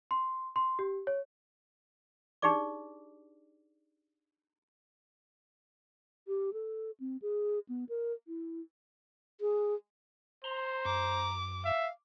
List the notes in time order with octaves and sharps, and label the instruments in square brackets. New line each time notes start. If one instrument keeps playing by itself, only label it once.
[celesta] C6
C6
G4
C#5
[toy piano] D4 D#4 G4 G#4 D5 D6
[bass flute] G4
A4
C4
G#4
B3
A#4
E4
G#4
[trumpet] C5 [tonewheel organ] A#5 C6
[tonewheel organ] F#2 [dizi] A#5 [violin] D6
[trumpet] E5 [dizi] F5